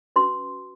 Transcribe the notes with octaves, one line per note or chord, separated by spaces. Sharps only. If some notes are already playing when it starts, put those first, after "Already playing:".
C#4 F#4 B4 C6